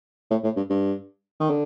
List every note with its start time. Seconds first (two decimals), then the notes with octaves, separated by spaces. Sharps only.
0.31 A2
0.44 A2
0.57 G2
0.70 G2
1.40 D#3
1.50 D3